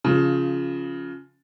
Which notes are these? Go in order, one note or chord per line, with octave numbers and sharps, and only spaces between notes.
C#3 F3